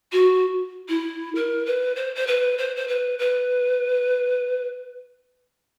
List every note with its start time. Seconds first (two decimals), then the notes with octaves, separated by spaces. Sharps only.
0.12 F#4
0.89 E4
1.35 A#4
1.66 B4
1.96 C5
2.15 C5
2.27 B4
2.58 C5
2.76 C5
2.88 B4
3.19 B4